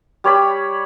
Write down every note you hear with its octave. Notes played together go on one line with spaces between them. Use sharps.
G3 C#5 D5 B5